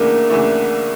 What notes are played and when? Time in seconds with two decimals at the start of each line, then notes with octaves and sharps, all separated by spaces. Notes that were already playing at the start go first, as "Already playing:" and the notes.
Already playing: D2 C#3 E3 A3 A#3 D4 A#4
0.30 D2 C#3 E3 A3 D4